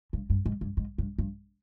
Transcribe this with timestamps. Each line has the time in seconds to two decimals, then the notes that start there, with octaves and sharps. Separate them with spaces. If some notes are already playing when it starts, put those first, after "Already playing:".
0.13 G2
0.30 G2
0.46 G#2
0.61 G2
0.77 G#2
0.98 G2
1.18 G2